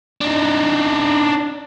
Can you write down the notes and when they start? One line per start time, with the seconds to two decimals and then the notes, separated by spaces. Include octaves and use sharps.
0.21 D4 D#4